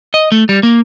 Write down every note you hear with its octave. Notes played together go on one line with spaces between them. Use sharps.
D#5
A3
G3
A#3